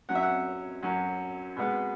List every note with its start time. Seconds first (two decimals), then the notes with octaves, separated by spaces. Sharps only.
0.09 F#2 F#3 C#4 F#5
0.15 E5
0.23 F#5
0.83 F#2 F#3 C#4
1.57 B2 G#3 B3